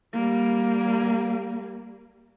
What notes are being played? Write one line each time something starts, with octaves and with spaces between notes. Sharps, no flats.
G3 A#3